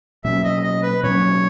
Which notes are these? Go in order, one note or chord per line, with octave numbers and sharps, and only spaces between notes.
B2 F#3 A#3 C#4 E5
D#5
D#5
B4
B2 F#3 A#3 C#4 C#5